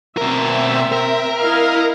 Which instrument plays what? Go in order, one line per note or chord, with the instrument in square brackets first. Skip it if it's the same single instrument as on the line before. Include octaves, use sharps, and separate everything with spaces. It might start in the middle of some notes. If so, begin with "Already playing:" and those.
[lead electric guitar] B2 A#4 [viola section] C4 E5
[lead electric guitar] A#4
[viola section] E4 D#5 F5